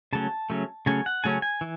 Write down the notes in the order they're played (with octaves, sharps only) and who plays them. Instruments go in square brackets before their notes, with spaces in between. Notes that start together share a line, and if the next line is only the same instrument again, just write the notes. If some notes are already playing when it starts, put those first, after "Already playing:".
[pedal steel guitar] C#3 F#3 A3 C#4 A5
C#3 F#3 A3 C#4
C#3 F#3 A3 C#4 G#5
F#5
C#3 F#3 A3 C#4 G#5
G#5
E3